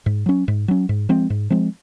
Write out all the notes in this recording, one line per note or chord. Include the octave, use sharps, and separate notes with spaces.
G#2
F#3 C#4
G#2
F#3 C#4
G#2
F3 G#3 C4
G#2
F3 G#3 C4